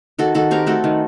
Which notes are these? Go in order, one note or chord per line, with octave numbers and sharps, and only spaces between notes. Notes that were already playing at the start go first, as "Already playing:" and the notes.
D#3 F#4 A4
D#3 F#4 A4
C4 G4 A#4
A3 F#4 A4
D#3